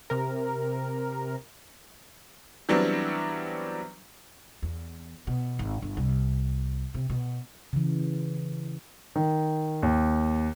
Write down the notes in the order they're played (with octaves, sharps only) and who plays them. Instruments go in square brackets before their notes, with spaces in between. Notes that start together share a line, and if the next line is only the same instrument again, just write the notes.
[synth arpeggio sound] C3 A#4
[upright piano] E3 F#3 G3 B3 C4 D4
[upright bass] E2
B2
G#1
G1
C2
C3
B2
[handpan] C#3 E3
[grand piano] D#3
D#2